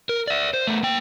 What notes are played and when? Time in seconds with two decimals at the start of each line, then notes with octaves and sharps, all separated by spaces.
0.09 A#4
0.28 D5 E5
0.54 C5
0.67 A3 B3
0.83 A#3 G5